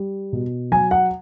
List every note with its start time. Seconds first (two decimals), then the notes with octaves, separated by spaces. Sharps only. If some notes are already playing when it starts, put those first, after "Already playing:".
Already playing: G3
0.33 B2
0.72 F#3 G#5
0.91 F#5